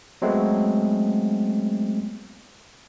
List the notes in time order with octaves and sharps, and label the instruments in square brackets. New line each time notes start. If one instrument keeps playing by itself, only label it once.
[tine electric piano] F#3 G#3 A3 B3 C4